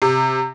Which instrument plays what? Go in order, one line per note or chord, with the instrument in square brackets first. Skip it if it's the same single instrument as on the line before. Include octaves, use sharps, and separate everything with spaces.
[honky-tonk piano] C3